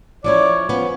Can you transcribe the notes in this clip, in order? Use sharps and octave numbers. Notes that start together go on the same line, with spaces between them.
F3 C#4 E4 C#5 D5
F3 B3 C#4